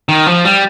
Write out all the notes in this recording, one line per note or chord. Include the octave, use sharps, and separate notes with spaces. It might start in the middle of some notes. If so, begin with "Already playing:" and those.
D#3
F3
G3